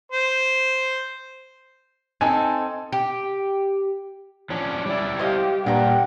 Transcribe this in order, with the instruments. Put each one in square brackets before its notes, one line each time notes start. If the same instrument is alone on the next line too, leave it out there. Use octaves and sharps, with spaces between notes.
[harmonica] C5
[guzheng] C4 D#4 A4 [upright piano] G#5
[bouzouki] G4
[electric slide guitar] F3 C#4 D4
[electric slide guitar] G3 E4 [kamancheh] D5
[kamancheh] G4 [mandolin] C5 D#5 F5
[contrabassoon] G2 [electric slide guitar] A#2 [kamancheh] F#5 [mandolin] G5 A#5